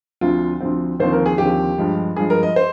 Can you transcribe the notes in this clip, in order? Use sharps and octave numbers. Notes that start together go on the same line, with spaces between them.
D2 D3 F3 C4 F4
D2 D3 F3 C4
D#2 D3 F3 C4 C5
A#4
G#4
D#2 D3 F3 C4 G4
G2 F3 G#3
G2 F3 G#3 G#4
A#4
D#5
C5